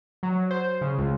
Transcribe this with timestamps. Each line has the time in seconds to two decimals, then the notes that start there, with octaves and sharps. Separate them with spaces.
0.23 F#3
0.51 C5
0.81 C#3
0.98 C#2